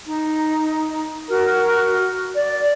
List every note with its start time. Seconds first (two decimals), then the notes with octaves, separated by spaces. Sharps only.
0.06 D#4
1.28 F#4 A#4
2.34 D5